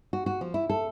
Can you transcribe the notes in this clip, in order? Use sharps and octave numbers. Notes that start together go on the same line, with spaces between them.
F#4
F#4
F3
E4
A4